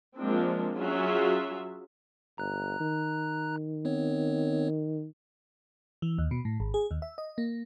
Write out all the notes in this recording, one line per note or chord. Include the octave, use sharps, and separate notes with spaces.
F3 G#3 A#3 C4 D4
F#3 C#4 F4 F#4 G#4 E5
G1 A#5 F#6
D#3
B3 C4 C#5
E3
D#2
B2
A2
G#1
G#4
D#2
E5
D#5
A#3